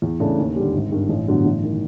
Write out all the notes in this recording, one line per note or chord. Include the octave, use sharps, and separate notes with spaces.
E2
C#3 E3 A3 D4
D#2
D3 G3
G#1
G2 D#3
A1
G2 D3 F#3 B3
A1
D#3